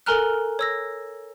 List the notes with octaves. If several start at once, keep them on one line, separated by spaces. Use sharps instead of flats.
A4 A#4 G#5 A#5 F6 F#6
C#5 E6 A#6